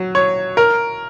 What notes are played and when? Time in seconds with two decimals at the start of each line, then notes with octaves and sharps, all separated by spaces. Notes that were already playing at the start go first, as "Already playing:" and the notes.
Already playing: F#3
0.15 C#5
0.57 A#4